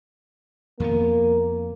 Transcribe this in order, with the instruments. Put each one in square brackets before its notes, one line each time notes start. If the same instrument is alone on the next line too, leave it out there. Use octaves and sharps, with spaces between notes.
[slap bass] F2 D#3 B3 [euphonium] A#3